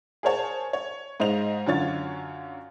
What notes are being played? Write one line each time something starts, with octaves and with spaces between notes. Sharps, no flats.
G#4 A#4 C5 C#5 A5
C#5
G#2 C5 D#5 F5 F7
F#2 D3 F4 C#5 A6